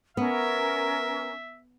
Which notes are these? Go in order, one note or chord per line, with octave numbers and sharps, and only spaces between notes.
B3 C#4 A#4 E5